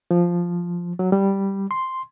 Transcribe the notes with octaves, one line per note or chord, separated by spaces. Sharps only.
F3
F#3
G3
C6